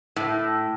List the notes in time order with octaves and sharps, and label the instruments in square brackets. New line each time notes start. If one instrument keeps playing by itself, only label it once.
[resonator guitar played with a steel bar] A2